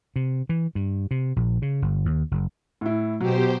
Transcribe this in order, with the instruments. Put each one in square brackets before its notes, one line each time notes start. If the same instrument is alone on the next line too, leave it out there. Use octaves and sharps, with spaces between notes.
[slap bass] C3
E3
G2
C3
A#1
C#3
G1
D#2
F#1
[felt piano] A2 E4
[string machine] B2 G4 C5 [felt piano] F#3